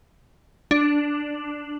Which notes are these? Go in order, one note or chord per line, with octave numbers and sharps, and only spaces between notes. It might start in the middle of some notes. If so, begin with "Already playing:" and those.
D4